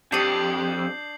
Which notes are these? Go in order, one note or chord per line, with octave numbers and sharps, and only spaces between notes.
F2 D4 G4 D#6 G6 C7 F#7